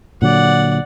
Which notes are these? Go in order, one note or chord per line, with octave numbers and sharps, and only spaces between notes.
A#2 D3 F#3 D5 F#5